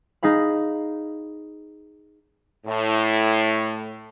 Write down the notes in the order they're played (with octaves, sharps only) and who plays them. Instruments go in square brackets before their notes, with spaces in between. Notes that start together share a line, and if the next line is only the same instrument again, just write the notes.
[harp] D#4 G#4 F5 B5
[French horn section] A2